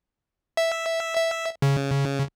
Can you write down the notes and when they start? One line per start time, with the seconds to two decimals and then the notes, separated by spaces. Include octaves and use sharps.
0.57 E5
1.17 E5
1.62 C#3